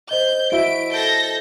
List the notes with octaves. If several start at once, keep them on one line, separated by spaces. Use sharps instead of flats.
C5 D#5 G6
E4 F#4 E5 D7
A4 G6 A#6